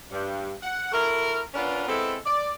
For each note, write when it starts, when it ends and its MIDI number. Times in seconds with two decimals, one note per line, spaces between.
0.11 0.52 43
0.63 0.89 78
0.92 1.40 64
0.92 1.40 66
0.92 1.40 69
0.92 1.40 70
1.54 1.87 59
1.54 1.87 61
1.54 1.87 62
1.54 1.87 65
1.54 1.87 70
1.54 1.87 71
1.88 2.16 56
1.88 2.16 59
1.88 2.16 60
1.88 2.16 64
1.88 2.16 69
2.25 2.51 74